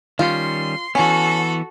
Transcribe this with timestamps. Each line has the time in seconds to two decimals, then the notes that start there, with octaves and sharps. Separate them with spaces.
0.19 D#3 G3 C#4 F4 C6
0.95 E3 B3 C#4 F#4 A4